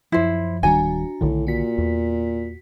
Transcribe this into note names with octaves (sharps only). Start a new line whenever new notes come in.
F#2 F3 E4 C5
D1 D#3 G3 D4 F#4 G#5 A#5
B1 A2 D3 D#3
A#2 F#4 B6
E2